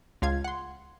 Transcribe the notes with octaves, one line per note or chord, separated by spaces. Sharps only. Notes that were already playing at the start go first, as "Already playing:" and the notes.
C#2 F4 F5 G#6
F#5 C6